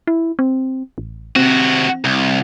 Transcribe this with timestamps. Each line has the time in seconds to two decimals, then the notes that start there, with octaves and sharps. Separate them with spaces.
0.07 E4
0.39 C4
0.98 A1
1.36 C3 C4 F#4
2.04 C2